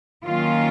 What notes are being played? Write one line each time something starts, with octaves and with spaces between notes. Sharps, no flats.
D#3 F#3 A#3 C#4 F4